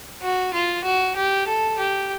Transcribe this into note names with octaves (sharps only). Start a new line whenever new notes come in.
F#4
F4
F#4
G4
A4
G4